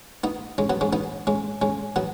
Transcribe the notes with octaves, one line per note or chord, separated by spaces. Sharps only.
B3 D#4
G#3 C#4
F#3 B3
G#3 C#4
B3 D#4
G#3 C#4
G#3 C#4
F#3 B3